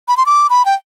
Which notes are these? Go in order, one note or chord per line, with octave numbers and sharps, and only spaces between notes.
B5
C6
D6
B5
G5